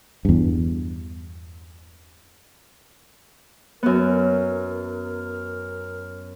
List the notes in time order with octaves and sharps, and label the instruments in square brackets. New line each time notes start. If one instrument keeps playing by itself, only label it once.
[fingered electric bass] E2 G2
[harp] F#2 B3 [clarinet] A#4